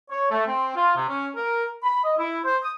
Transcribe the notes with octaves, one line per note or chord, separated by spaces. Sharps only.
C#5
A3
C4
F4
C3
C#4
A#4
B5
D#5
E4
C5
D#6